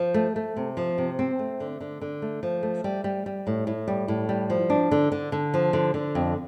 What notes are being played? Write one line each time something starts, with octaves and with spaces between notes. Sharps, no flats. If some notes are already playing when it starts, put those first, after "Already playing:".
Already playing: F3
A3
A3
C3
F3
C3
C4
A3
D3
D3
D3
A3
F3
A3
G3
G3
G3
A2
A2
G3
A2
G3
F3
D4
D3
D3
D3
F3
D3
D3
F2